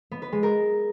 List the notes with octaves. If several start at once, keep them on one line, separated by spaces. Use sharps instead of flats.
B3
B4
G#3
A#4